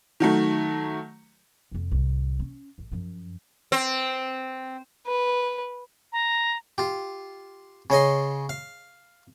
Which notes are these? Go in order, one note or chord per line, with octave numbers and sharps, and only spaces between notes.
D#3 F#3 A3
F2 C3
C2 A2
C#4
A1 D#3
F#2 F3
C4
B4
A#5
F4 G4
C#3 C#5 D#5 C6
F5